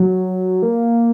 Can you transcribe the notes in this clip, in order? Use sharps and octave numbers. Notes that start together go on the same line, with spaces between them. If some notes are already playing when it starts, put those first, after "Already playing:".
Already playing: F#3
A#3